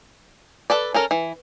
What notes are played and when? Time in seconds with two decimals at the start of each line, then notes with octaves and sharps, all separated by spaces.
0.70 A4 B4 D5
0.94 C#4 A4 A#4
1.11 E3